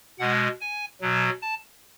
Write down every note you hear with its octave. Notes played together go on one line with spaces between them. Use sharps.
B2 G#3 F#5
G#5
B2 F#3
A5